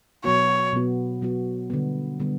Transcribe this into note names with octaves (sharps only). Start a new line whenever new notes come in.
B2 F#3 B3 F#4 C#5
B2 F#3 B3 F#4
B2 F#3 B3 F#4
D3 G3 B3
D3 G3 B3